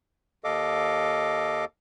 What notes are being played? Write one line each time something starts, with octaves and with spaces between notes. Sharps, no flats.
D#2 A4 D#5 F5 D6